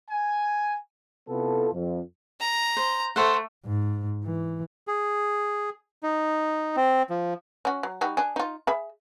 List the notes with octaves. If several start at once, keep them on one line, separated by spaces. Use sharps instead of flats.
G#5
C3 B3 E4 F4 A4
F2
A#5
C5
A3 C5 F#5
G#2
E3
G#4
D#4
C4
F3
C#4 F#4
F#3
G3 D#4 F#4
D4 G#4
D#4 F4
G#4 E5 B5